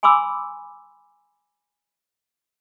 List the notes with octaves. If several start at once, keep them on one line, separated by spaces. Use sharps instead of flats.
G#5 B5 C6 D6 E6